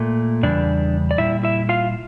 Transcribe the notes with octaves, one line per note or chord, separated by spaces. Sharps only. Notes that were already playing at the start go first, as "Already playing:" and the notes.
Already playing: A#2 A3
E2 C#3 G3 D4 D5
D5
A#2 G3 E4 E5
E4 E5
F4 F5